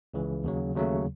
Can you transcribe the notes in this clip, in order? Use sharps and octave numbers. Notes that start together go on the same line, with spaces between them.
C#2 C#3 E3
D#2 C#3 F#3
D#2 C#3 F#3 A3